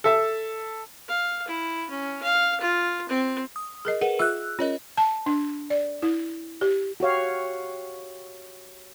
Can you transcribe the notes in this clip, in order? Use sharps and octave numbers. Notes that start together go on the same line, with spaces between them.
A4 E5 A5
F5
E4
C#4
F5
F4
C4
D#6
G#4 A#4 D#5
G#4 A#4 B4 F#5
F4 G#4 E5 E6 F#6
C#4 F4 A#4 C#5 D#5
A5
D4
D5
E4
G4
F#4 G4 C#5 F5